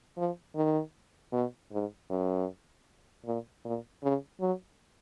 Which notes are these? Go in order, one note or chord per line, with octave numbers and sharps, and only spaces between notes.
F3
D#3
B2
G#2
F#2
A#2
A#2
C#3
F#3